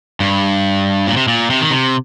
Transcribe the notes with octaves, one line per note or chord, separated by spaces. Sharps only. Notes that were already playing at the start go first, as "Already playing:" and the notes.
G2
A#2
C3
A#2
C3
D#3
C3